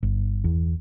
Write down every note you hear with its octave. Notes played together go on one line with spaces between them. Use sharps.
G1
E2